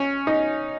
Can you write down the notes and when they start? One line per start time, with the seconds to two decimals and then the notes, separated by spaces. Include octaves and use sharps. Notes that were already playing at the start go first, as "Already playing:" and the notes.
Already playing: C#4
0.27 D#4